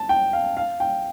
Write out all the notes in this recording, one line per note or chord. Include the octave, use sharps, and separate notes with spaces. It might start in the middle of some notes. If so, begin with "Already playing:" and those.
Already playing: A5
G5
F5
F5
G5